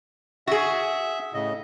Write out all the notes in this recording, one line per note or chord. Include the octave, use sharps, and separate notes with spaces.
F#4 G#4 E5
A2 C#3 D#5